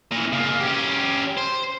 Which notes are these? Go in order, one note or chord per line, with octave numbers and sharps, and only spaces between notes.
A#2 E3
C#3 A#3
C#4 G4
C5